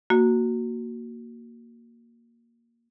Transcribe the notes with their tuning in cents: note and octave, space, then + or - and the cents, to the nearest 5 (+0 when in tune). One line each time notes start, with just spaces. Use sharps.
A#3 +0 F#4 +0